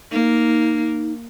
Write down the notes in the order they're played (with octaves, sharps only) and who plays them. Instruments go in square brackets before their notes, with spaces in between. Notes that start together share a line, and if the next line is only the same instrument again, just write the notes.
[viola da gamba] A#3 [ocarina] D#4